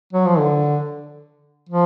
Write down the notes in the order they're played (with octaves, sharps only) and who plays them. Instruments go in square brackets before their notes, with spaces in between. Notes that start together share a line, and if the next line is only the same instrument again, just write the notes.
[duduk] F#3
F3
D3
F3